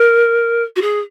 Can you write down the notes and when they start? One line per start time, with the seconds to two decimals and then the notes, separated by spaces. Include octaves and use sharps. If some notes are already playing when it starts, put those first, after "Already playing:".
Already playing: A#4
0.76 F#4
0.82 G#4